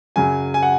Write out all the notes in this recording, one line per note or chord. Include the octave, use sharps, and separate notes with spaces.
F#2 C#3 F#3 G#5
G#5
F#5